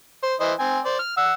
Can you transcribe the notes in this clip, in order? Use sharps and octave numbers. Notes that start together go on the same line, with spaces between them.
C5
E3 C5 D#5
C4 G#5
C5 D5
F6
F#5 E6